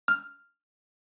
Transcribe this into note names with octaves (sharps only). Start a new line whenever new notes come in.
F6